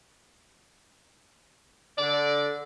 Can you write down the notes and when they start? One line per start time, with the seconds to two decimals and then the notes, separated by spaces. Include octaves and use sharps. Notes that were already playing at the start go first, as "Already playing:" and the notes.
1.98 D3 D5